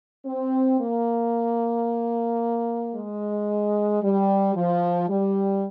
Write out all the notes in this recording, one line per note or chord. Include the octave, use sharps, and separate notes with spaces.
C4
A#3
G#3
G3
F3
G3